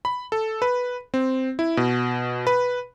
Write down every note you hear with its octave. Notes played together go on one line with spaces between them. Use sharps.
B5
A4
B4
C4
E4
B2
B4